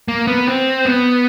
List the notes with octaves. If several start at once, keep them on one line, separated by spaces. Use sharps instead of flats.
A#3
B3
C4
B3